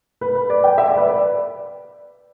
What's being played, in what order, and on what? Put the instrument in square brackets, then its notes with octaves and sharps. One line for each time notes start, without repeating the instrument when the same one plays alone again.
[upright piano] B4
B4
D5
G5
E5
D5
B4
D5